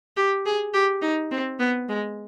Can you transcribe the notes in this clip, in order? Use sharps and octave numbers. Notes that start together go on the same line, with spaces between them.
G4
G#4
G4
D#4
C4
B3
G#3